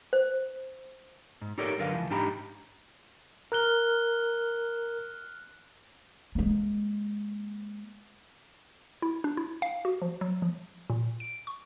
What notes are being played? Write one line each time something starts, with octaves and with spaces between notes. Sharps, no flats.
C5
G#2
D#4 G4 A4 A#4 C#5 D5
F#2 D3 F#3 A#4 B4 F5
C#2 E3 F3
G#2 D4 D#4 G4 A#5 B5
A#4 F6 F#6 G7
G#3 A#3
E4
D4
E4
F5
F#4
F3
F#3
F3
A#2
D7
C#6